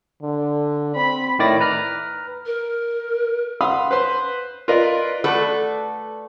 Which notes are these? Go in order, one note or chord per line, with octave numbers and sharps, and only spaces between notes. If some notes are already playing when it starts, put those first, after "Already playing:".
D3
C4 B5
A2 D#3 E4 D5 A6 A#6
B4 A#5 F6
A#4
F5 F#5 B5 C6 D#6
B4 C5 C6
F4 A#4 B4 D5 D#5
A3 F#4 A4 B4 D5